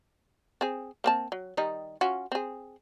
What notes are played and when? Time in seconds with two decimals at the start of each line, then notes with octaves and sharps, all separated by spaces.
0.61 C4 G#4
1.04 A#3 C4 A5
1.32 F#3
1.57 D#3 G3 D#4
2.01 C#4 F4 F#4
2.32 C4 G#4